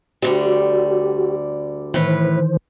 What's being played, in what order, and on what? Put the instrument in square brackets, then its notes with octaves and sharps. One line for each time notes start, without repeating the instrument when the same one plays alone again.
[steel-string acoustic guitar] D2 D3 G3 [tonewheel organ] F#4 G4
[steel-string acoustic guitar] A2 B4 [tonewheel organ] D#3 E3 C5